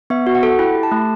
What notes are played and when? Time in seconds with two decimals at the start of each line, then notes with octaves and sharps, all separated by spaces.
0.10 B3 E5
0.27 F#4
0.35 F#5
0.43 A4
0.59 E4 G5
0.75 G4
0.83 A5
0.92 A3